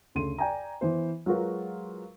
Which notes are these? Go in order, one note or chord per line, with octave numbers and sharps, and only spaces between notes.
D2 C#3 C6 D#7
D5 G5 G#5 A#5
E3 B3 C5
F#3 G#3 F4 F#4 A#4 B4